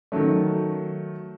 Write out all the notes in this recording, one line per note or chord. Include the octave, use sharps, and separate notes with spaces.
D#3 F#3 A3